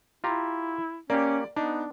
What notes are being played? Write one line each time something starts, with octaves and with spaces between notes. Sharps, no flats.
E4 F4 G4 A#5
A#3 C#4 G4 D5
B3 D4 D#4